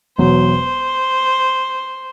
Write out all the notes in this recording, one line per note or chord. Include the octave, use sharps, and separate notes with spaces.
E1 E2 B2 F#3 C5